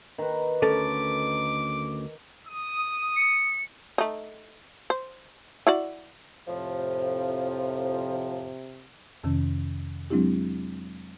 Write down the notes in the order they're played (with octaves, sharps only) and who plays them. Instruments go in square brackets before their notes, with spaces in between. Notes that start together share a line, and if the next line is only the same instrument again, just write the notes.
[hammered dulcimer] D#3 B4
[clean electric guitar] D2 C#4 A5 [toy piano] A4 [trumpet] D6
[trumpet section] D#6
[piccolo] C#7
[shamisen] A3 D#4
C5
E4 F#4 D5
[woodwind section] F2 A2 F3 [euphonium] C3
[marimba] F2 C3 D#3 C#4
F#3 G#3 C4 D4 E4 G4